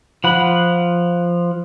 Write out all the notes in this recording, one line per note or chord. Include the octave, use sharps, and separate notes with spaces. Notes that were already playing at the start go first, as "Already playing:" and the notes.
F3 F#5 B5